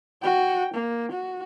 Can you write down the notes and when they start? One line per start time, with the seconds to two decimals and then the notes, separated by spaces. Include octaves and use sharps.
0.23 F#4 G5
0.74 A#3
1.12 F#4